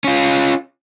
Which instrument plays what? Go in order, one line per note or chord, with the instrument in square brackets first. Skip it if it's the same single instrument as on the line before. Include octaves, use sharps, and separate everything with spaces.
[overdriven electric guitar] C#4 F4